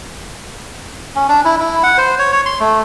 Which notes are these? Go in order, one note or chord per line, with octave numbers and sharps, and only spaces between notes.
C#4
D4
E4
E4
F#5
C5
C#5
C#5
C6
A3